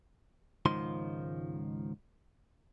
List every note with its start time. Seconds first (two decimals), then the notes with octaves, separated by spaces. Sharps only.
0.66 C#2 G#2 D#3 F3 C6